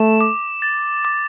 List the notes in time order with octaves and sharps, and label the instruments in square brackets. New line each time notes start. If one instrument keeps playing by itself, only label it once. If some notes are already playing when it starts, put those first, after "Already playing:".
Already playing: [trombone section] A3 [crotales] E7
[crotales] D6
A6
D6